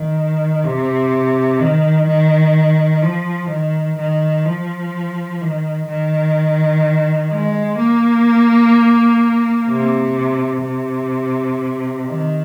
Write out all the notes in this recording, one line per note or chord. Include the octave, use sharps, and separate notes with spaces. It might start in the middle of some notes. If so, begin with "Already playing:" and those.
Already playing: D#3
C3
D#3
D#3
F3
D#3
D#3
F3
D#3
D#3
G#3
A#3
C3
C3
D#3